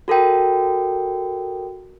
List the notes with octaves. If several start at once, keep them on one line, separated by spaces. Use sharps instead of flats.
F#4 A4 A#4 G5